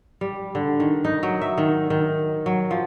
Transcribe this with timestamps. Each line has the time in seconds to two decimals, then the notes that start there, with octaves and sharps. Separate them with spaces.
0.21 G3
0.55 D3
0.80 D#3
1.05 D#4
1.23 F#3
1.41 E5
1.58 D#3
1.90 D#3
2.46 F#3
2.71 F3